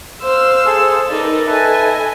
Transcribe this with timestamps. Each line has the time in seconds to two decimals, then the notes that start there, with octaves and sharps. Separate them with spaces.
0.21 C5 F5 E6
0.66 G#4 A4
1.09 D#4 A#4 B4 D5
1.46 A4 B4 D#5 E5 G#5 A5